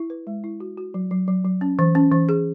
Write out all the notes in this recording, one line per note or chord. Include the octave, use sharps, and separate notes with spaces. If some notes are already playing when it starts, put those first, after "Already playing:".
Already playing: E4
B4
G#3
E4
F#4
F#4
F#3
F#3
F#3
F#3
C#4
E3
C#4
E3
G#4